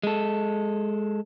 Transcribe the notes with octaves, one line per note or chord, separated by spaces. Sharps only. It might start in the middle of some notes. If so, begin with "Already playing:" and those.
G#3 A4